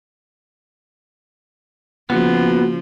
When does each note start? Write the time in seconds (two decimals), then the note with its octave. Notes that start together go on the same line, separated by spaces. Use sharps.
2.10 C#3 F3 A#3 B3 F#4